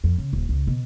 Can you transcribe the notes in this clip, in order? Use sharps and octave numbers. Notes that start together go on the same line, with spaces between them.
F2
C#3
D#1
C#2
B2